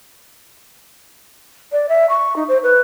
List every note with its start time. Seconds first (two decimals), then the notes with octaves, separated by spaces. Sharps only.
1.72 D5
1.88 E5
2.09 C#6
2.36 D#4
2.48 C5
2.63 B4